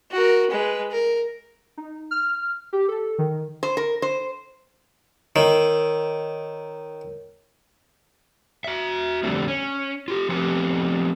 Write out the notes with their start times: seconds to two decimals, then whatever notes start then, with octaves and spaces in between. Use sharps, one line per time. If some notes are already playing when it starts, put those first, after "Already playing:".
0.11 F#4 A#4
0.51 G#3 B4
0.91 A#4
1.77 D#4
2.11 F6
2.73 G4
2.88 A4
3.18 D#3
3.63 C5
3.77 A#4
4.02 C5
5.36 D#3 A#4 C#5
8.64 F#4 E5
9.23 F2 D3 G3 A3 C4
9.48 C#4
10.08 F4 G4
10.29 F3 A3 B3 C4 G4